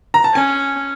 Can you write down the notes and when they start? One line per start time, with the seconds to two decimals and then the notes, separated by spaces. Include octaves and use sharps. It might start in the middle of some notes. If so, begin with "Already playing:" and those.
0.14 A#5
0.24 A5
0.34 C#4 G#5